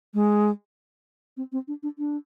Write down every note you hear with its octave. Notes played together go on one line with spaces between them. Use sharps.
G#3
C4
C4
D4
D4
D4